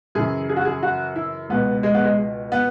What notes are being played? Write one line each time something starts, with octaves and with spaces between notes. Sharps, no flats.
F#2 C#3 E3 G#4
G#4
F#4
G#4
F#4
E4
C#2 B2 B3
G#3
B3
G#3
B3